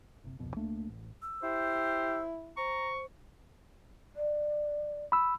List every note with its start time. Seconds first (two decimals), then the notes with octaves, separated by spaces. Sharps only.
0.24 F#1 C3
0.39 D1 C2 F2 B2
0.56 C#2 A3 A#3 D4
0.89 A1
1.22 E6
1.43 E4 G4 C5
2.57 C5 A#5 C#6
4.16 D5
5.12 B5 E6